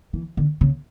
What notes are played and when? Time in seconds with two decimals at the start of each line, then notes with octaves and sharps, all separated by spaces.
0.13 E3
0.37 D3
0.61 C#3